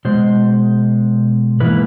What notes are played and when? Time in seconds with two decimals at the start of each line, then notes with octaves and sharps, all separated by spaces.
0.05 B2 G#3 C5
1.60 G#2 E3 A#3 B4